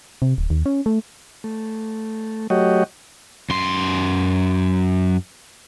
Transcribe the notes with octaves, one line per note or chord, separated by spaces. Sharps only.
C3
D1
D#2
C#4
A3
A3
F#3 A3 F#4 G4 C#5 D#5
F#2 C6